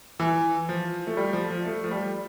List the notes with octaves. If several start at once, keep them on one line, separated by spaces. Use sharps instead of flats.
E3
F3
A3
G3
F3
F3
A3
F3
G3